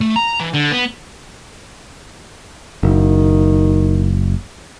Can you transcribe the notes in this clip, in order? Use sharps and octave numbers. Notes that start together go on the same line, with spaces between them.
A3
A#5
E3
D3
B3
F#1 D#3